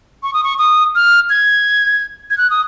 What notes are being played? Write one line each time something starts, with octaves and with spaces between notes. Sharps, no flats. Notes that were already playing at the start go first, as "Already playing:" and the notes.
C#6
D#6
C#6
D#6
F6
G#6
G#6
F#6
D#6